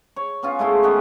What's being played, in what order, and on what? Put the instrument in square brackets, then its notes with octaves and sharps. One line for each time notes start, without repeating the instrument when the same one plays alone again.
[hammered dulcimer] C#5
B3 C#4 F4
G#3 A3 E4 F4
D#3 B3 C#4